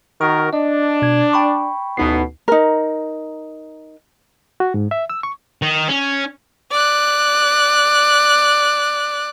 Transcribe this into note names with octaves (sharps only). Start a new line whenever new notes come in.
D#3 F#4 A#4 C#6
D4 D#5
B2 G#6
G5 B5 C#6
A1 D2 B2 B3 D#4 C7
D#4 A#4
F#4
G#2
E5
E6
C#6
D#3
C#4
D5 F#6